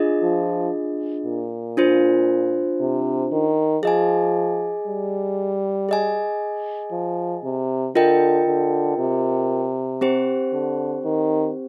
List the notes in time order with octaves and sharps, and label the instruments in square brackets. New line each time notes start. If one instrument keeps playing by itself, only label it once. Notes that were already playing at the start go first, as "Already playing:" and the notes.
Already playing: [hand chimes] D4 F4 G#4 D#5
[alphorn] F3
A#2
[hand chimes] D4 F4 C5
[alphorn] C3
D#3
[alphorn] F3 [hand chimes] G#4 D#5 G#5
[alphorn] G3
[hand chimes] G#4 D#5 G#5
[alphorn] F3
C3
[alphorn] D3 [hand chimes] F4 A#4 D#5 G5
[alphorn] D3
C3
[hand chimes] C4 G4 C5
[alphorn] D3
D#3